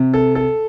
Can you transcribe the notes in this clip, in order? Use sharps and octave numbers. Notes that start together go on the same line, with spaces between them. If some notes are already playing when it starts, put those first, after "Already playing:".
Already playing: C3
A4
A4